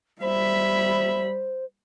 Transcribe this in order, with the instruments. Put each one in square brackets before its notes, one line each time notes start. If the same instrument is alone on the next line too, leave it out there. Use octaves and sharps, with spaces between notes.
[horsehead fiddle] G3 B5 [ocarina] C5 [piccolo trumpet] E5